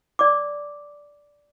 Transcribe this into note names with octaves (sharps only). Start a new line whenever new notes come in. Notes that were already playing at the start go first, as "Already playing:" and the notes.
D5 D6